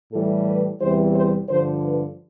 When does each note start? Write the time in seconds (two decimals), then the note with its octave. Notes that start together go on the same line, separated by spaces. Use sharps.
0.11 A2 E3 G3 A4
0.46 B4
0.80 E2 C3 E3 G3 C5
1.15 C5
1.49 G2 D3 F3 C5
1.83 B4